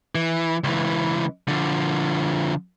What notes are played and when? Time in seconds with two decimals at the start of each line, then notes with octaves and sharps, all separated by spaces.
0.15 E3
0.64 C#2 E3
1.48 D3 F3